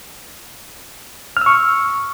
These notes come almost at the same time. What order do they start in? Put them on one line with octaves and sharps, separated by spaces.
F6 E6 C#6